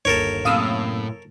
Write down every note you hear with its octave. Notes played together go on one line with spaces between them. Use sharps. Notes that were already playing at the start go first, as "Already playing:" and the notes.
G1 D#2 A4 A#4 C#5
F#2 A2 C3 A#3 F5 D#6 E6